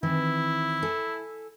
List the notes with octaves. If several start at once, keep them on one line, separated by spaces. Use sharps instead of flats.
D#3 E3 C4 E4
A4 G#5